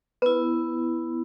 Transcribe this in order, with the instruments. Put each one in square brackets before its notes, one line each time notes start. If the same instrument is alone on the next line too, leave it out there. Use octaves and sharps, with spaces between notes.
[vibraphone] B3 E4 [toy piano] B4